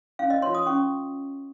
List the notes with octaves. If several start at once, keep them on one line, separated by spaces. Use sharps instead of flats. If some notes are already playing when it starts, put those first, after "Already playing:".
C#4 F5
D#5
F4 A#4 C#5 C6
D#6
C#4 C#6